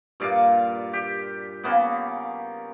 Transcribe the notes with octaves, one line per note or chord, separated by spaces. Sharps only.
G2 A#2 D5 F5
G4
C#3 A#3 B3